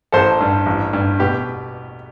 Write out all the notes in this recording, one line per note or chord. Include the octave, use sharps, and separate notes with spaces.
A1 A4 C5
G2
A1
G2
B2 G4 B4